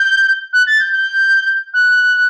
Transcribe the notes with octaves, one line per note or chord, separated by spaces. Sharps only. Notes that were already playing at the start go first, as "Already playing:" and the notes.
Already playing: G6
F#6
A6
G6
G6
F#6